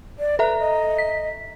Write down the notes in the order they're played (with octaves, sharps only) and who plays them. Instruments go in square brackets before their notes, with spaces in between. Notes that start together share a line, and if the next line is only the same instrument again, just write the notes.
[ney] D5
[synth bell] A4 E5 A#5 [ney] B4
[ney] D#5
[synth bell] B6